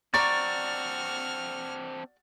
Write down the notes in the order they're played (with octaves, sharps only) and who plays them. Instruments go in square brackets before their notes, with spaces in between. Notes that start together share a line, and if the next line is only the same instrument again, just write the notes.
[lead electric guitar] C4 D4 [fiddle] F#4 F6 [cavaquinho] D5 A#5 C#6 [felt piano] A6